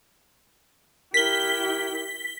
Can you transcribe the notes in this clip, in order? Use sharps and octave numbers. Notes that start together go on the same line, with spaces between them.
E4 G4 A#4 B6 G7